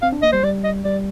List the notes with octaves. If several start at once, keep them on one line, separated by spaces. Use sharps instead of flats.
C4 F5
D4
A#3 D#5
G3 C5
G3 D5
D#5
G3 D5